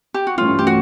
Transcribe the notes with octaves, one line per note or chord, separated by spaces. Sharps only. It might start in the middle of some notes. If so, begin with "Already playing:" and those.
G4
F#4
G2 E3 A3 C#4 F4
G4
F#4